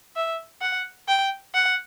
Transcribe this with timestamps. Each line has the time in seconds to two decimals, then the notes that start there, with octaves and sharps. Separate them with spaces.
0.16 E5
0.61 F#5
1.08 G5
1.55 F#5